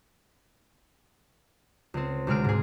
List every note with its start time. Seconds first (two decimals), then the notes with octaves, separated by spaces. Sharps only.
1.94 C#2 C4
2.27 D2 C3 G#3 C4 F6 D7
2.44 G#2 G#4